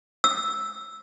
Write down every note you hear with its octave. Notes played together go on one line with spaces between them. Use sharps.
E6